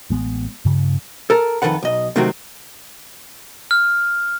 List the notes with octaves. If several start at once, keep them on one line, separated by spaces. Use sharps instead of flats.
A1 G#3 B3
G2 C#3
A4 A#4
F2 C3 D#3 A4 B4 F#5
B1 D#5
C3 D#3 F#3 A3 C4 F#4
F6